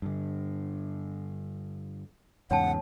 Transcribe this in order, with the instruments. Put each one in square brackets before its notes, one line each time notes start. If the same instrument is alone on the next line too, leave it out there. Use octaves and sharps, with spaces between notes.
[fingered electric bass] G2 D3
[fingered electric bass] E2 G#2 C#3 [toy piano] C#5 G5 A5 [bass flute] F#5